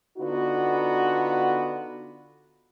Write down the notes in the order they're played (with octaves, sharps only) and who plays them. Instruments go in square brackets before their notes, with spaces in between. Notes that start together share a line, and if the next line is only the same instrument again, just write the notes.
[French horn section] D3 B3 D#4 F4 F#4